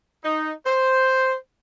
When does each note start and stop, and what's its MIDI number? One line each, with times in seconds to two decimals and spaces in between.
0.24 0.52 63
0.66 1.35 72